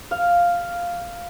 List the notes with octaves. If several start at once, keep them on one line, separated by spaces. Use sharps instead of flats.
F5